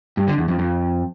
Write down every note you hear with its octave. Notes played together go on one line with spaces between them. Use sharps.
G2
D3
E2
F2
F2